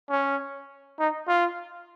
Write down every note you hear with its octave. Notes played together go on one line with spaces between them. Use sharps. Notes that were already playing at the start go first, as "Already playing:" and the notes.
C#4
D#4
F4